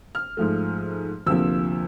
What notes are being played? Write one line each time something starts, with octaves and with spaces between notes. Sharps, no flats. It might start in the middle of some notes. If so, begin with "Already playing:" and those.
F6
G#2 F3 A3
D2 C3 F3 A#3 E6